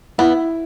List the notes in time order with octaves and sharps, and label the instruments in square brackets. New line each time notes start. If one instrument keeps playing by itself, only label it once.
[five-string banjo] B3 [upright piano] E4